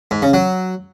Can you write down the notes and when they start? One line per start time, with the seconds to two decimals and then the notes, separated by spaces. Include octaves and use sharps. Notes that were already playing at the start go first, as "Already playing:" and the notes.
0.11 G#2
0.22 C#3
0.33 F#3